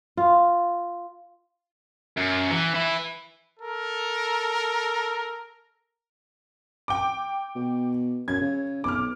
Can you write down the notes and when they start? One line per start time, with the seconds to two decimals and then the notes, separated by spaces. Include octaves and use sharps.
0.17 F4
2.17 F#2
2.51 E3
2.74 E3 E4
3.59 A4 A#4
6.88 G5 D6
7.56 B2
8.28 F#2 G#6
8.41 C#3
8.84 B1 D6 F6